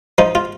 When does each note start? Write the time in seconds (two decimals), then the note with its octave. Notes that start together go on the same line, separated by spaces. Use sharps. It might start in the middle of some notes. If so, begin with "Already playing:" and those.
0.18 F3 D#4
0.35 F4